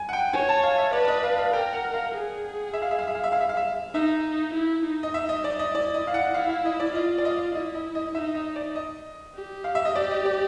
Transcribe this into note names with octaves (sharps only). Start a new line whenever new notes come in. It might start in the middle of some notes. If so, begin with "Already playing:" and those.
Already playing: G#5
F#5
G5
C#5 G#5
A5
F5
E5
B4 D5
D5
D#5
F5
F5
A#4 G5
F#5
F5
G#4
E5
F5
E5
F5
E5
F5
E5
F5
E5
F5
E5
D#4 E5
E4
D#4
D#5
D#4 E5
D#5
D5
D#5
E4 D5
D#5
F5
F#5
E4 F5
F5
D#5
D5
F4 D#5
D5
D#5
E4 D#5
D#5
D#5
D#4 E5
D#5
D5
D#5
G4
F5
E5
D#5
G4 D5
D#5
D5